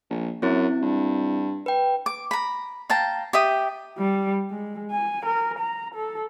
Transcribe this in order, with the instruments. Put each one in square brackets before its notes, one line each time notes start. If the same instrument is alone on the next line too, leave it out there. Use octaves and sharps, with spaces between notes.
[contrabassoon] A#1
[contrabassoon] F#2 [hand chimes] C4 E4
[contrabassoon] G2
[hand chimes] B4 G5
[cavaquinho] D6
A#5 B5
F5 G5 A5 A#5
G4 E5 D#6
[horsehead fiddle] G3
G#3
G#5
A#4
A#5
A4